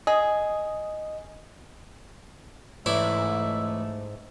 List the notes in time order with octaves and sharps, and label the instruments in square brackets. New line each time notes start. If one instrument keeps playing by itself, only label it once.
[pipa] G#4 [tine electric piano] D#5
[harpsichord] A1 E4 D5 [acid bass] G#2 [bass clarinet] A3 [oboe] E5